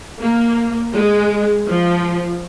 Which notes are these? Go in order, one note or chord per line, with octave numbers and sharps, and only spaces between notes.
A#3
G#3
F3